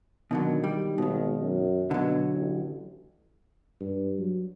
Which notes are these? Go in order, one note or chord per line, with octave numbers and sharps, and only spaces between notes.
B2 D3 D#3 F#3
G3
G#1 B2 D#3
F#2
B2 D3 F#3
A1
G2
F#3